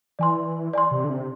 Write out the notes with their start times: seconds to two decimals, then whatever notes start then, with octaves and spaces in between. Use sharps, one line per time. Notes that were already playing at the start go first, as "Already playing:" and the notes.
0.19 E3 D5 G#5 C6
0.73 D5 G#5 C6
0.91 C3
1.04 D3
1.10 C3